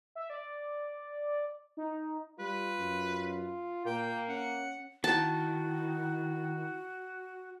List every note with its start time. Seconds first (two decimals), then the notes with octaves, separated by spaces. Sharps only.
0.15 E5
0.30 D5
1.77 D#4
2.39 G3 F4 B4
2.80 F#2
3.86 A#2 A#3 G5
4.29 C#4 F#5
5.04 D#3 E4 F#4 A5